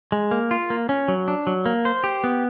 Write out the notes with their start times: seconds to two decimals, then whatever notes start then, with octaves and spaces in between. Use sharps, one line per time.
0.12 G#3
0.31 A#3
0.51 F4
0.70 A#3
0.89 C#4
1.08 F#3
1.28 D4
1.47 F#3
1.66 A#3
1.85 C5
2.04 G4
2.24 B3